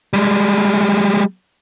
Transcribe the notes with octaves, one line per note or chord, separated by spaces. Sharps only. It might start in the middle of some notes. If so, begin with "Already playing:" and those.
G3 G#3